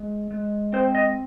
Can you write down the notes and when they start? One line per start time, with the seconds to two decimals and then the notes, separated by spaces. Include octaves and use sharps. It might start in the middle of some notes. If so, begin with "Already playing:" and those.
Already playing: G#3
0.31 G#3
0.73 C4 C5
0.95 D#5